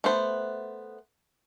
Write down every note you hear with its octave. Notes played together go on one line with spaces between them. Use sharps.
A3 B3 C5